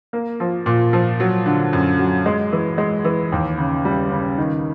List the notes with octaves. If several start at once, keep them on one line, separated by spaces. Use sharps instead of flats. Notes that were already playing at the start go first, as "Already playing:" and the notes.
A#3
F3
A#2
F3
F#3
D3
F#2
F#3
G#3
E3
G#3
E3
D#2
C#3
G3
C#3
D#3